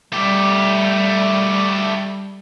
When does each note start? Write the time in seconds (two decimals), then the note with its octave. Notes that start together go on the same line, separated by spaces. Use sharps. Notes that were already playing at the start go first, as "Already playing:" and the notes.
0.12 G3 A3 G4